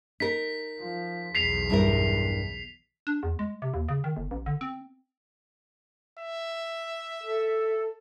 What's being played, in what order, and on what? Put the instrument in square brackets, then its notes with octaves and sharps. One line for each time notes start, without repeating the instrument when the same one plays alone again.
[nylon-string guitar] D#4 A#4 [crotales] B6
[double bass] F3
[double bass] B1 E2 [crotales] B6 C7 F7
[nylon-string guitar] G2 E4 A#4
[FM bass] D4
E2
G#3
C3
D#2
C#3
D#3
G1
A1
D3
C4
[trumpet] E5
[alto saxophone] A4